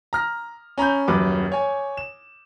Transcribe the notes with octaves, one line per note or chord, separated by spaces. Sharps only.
A#5 F6 A#6
C#4 A#5 B5 G6
D#1 F#2 B4 D6
C#5 G#5
E7